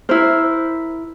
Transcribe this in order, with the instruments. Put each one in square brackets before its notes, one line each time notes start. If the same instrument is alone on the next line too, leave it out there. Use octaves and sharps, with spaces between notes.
[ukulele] E4 A#4 C5